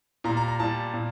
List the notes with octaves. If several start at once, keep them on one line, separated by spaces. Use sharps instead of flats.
A#2 G3 A#5
A#5
A#5
A#2 G3 A5
A#2